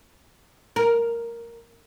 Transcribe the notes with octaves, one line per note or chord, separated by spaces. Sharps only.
A#4